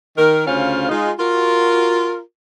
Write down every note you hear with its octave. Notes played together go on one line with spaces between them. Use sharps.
D#3 A#4
D2 C#3 C#4 F4 C5 F5
G#3 D#4 F4
F4 F#4 A#4